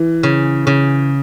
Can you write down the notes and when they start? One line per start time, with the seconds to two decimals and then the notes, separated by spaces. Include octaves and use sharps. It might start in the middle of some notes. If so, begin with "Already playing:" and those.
Already playing: E3
0.23 C#3
0.67 C#3